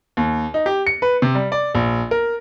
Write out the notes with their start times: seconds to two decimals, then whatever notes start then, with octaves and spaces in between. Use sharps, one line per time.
0.17 D#2
0.54 D#4
0.66 G4
0.87 C#7
1.02 B4
1.22 C3
1.35 G3
1.52 D5
1.75 A#1
2.11 A#4